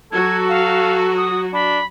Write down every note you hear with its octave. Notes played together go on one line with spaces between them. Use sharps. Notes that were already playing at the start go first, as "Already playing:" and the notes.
F#3 F#4 A4 G#6
F5
D#6
D4 B5